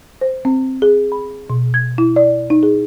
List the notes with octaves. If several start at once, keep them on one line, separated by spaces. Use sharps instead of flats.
C5
C4
G#4
B5
B2
G#6
E4
D5
D#4
G#4